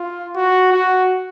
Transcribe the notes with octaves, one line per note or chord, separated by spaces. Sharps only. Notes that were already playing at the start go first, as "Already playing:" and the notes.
Already playing: F4
F#4
F#4